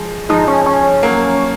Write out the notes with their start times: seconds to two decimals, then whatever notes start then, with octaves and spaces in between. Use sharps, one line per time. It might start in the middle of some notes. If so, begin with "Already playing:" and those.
Already playing: F3 G#3
0.29 F3 G#3 D#4
0.48 C#4
0.66 C#4
1.03 F#3 A#3